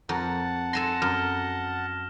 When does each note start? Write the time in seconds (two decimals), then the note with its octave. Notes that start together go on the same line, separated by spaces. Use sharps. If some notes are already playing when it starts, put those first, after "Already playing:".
0.09 F2 A#4 F#5 A5
0.73 A4 G#5 C6 A#6 E7
1.02 F#2 F6